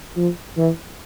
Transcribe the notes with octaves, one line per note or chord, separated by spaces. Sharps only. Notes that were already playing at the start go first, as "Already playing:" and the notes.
F3
E3